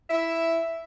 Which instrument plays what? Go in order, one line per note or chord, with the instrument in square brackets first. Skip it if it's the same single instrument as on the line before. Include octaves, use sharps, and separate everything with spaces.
[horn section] E4 E5